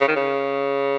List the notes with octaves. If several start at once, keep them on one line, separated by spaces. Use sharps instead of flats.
C#3
D#3
C#3